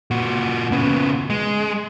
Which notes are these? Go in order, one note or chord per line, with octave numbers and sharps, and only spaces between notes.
A#2 F#4
C#3 B3
G#3